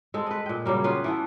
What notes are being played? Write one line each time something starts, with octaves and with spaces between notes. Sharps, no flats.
G#3 C4 A4
B4 D#5
A#2 G5
C#3 F#3 G3 A#3
B3 C#4 F4 B4
E3 B3 A4